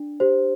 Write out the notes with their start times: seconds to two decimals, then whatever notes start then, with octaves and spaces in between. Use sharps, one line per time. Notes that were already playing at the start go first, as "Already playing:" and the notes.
Already playing: D4
0.20 G4 C5